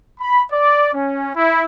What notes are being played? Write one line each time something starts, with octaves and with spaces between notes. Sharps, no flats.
B5
D5
C#4
E4